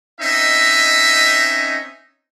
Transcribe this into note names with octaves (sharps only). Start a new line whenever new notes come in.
C4 C#4 D#4 D#5 E5